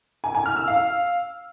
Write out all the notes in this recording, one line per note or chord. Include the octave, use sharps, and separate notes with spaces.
G#5
G#5
F6
E6
F5